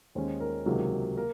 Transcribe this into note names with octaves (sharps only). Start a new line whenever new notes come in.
D#2 D#3 G#3 C#4 C5
A#4
C#2 C3 D#3 F#3 A#3 G#4
A#3 A#4